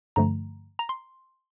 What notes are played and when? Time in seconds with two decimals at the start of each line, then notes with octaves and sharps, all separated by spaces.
0.16 G2 D3 F3 A3 A#5
0.79 A#5
0.89 C6